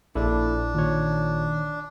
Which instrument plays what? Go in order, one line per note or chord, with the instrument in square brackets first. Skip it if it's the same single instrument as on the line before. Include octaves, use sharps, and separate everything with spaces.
[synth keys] A#1 [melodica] D4 [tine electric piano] E4 A4
[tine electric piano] A#2 C#5 [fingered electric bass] D#3